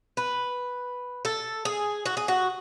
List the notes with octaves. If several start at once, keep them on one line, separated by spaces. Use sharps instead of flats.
B4
A4
G#4
F#4
G#4
F#4